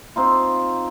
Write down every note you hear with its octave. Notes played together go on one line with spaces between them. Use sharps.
C4 D#4 F4